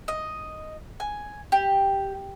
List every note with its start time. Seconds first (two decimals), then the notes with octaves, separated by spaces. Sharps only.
0.08 D#5
1.00 G#5
1.52 G4